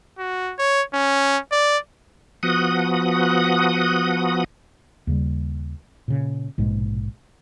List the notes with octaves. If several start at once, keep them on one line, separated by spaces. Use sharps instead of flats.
F#4
C#5
C#4
D5
F3 B3 F#4 F#5 D#6
D#2 C#3 G3
A#2 C#3
A#1 G#2 B2 G#3